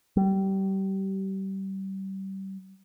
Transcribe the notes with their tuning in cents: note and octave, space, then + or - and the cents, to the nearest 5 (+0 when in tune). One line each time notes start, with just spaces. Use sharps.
G3 -25